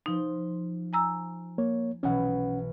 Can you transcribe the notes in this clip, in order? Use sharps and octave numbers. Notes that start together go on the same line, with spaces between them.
F3 D#4 C6
G#5 A#5 E6
A#3 C#5
B1 B2 E3 C#4 F#5